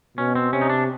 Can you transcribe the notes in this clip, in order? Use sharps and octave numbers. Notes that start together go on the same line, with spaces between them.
B2 C#4
C4
C3 C#4
D#4
D4